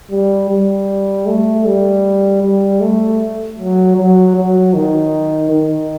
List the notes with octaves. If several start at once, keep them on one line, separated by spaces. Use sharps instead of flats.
G3
G3
A3
G3
G3
A3
F#3
F#3
F#3
D#3
D#3